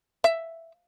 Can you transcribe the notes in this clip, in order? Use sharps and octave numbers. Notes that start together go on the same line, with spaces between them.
E5